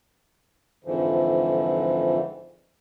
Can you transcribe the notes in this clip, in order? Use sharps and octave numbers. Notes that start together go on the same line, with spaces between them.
F2 G#2 D3 E3 F3